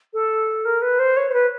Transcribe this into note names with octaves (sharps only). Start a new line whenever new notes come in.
A4
A#4
B4
C5
C#5
C5
B4